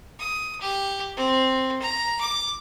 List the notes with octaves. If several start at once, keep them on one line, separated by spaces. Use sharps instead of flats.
D#6
G4
C4
A#5
D6